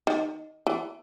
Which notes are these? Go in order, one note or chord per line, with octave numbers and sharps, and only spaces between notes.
D#3
E3